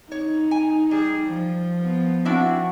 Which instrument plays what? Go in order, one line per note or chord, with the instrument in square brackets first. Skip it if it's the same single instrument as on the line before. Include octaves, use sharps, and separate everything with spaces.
[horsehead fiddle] D#4 [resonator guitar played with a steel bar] C#5
[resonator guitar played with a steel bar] G#5
[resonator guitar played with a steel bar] G3 [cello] G#4
[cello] F3
[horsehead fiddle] B3
[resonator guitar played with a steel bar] C4 D4 E4 [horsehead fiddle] F#4